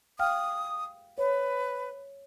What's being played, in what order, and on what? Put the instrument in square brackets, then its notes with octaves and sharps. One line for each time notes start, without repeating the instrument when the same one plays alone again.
[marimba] F5 G5 F6 [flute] D#6
[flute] B4 [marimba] C#5